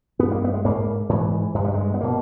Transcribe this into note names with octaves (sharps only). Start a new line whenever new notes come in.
G2 B3
A#3
B3
G#3
G#2 A#3
G#2 E3
G2 G#3
G3
G#3
B3
B2 A#3